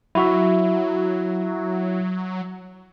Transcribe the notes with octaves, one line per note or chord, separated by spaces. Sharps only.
F#3 E4 F#4 E5